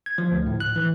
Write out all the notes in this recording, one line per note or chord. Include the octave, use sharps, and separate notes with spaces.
G#6
F3
D2
A2
F#6
E3